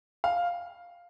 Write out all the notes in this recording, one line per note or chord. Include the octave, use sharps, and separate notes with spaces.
F5